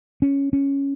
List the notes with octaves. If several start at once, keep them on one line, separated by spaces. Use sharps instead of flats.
C#4
C#4